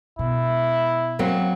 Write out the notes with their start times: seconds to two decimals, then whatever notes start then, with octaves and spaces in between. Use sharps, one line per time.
0.19 B2 E4
1.19 F#3 A#3 C4